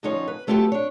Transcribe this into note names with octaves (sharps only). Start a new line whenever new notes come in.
D3 F3 C#4 D#4 C5 C#5
B4
F#3 A3 F4 G4 A4 B4
D4 C#5